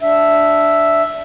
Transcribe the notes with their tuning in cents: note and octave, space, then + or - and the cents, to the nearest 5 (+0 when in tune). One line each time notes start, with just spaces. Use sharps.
D4 -5 E5 +0